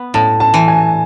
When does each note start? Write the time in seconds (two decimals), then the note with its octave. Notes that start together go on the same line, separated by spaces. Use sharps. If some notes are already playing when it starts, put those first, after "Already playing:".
Already playing: B3
0.14 A2 A5
0.40 A5
0.54 E3
0.68 G#5